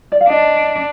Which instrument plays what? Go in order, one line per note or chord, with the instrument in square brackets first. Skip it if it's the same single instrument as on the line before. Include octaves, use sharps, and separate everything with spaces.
[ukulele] D5
F5
[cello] D4 [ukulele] D#5